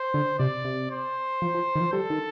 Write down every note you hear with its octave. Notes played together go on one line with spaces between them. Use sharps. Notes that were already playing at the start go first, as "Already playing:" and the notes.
Already playing: C5
D3
C3 D5
C3
C5
F3
F3
D#3
F3
G3 A4
D#3